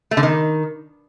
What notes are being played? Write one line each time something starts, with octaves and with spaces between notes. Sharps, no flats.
A3
D3
D#3